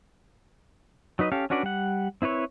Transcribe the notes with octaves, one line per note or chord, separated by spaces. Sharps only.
F#3 D#4 B4 D#5
C#4 G4 A4 F5
C#4 D4 F#4 B4 D5
G3 F#5
C4 E4 B4 C#5